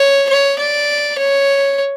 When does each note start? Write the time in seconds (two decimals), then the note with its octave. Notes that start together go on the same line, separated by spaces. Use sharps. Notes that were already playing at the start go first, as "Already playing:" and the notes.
Already playing: C#5
0.30 C#5
0.59 D5
1.18 C#5